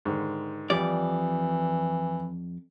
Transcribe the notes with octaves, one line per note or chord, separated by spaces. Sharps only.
G#2 D3 D#3
F2 E3 G3 D5